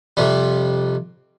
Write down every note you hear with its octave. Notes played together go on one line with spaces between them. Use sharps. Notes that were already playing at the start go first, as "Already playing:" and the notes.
F2 C3 G3